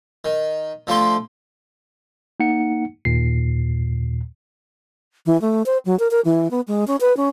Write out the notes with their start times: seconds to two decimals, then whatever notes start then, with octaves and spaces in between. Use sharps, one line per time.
0.25 D#3
0.87 D3 F3 A3 C6
2.40 A#3 D#4 F#5 C#7
3.05 D#2 A#2 C7
5.26 E3
5.41 A3
5.66 C5
5.85 F#3
5.99 A#4
6.11 A#4
6.25 E3
6.51 B3
6.68 G#3
6.87 C#4
7.01 B4
7.17 C#4